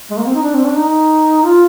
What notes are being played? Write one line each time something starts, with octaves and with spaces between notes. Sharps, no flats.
G#3
A#3
C4
D#4
D4
C4
D4
D#4
F4